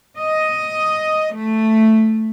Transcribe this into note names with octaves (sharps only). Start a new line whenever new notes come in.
D#5
A3